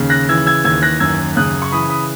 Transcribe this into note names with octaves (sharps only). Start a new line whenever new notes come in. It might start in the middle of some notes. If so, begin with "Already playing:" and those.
Already playing: D#2 C#3
F#6 A#6
E3 E6 G#6
E6 G#6
D#2 E6 G#6
F#6 A#6
F#2 E6 G#6
C#3 D#6 F#6
C#6
E3 B5 D#6
B5 D#6